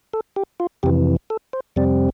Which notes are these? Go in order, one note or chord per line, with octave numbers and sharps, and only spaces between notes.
A4
G4
F4
F2 C3 E3 G4
A4
C5
F2 C3 G3 C4 D5